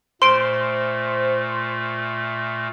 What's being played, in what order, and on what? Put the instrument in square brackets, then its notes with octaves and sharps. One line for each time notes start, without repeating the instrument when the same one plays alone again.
[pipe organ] A#2 A3 [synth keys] C5 [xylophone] C6 D7